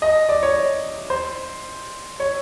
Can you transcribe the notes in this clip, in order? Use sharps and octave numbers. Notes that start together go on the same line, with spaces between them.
D#5
D5
C#5
C5
C#5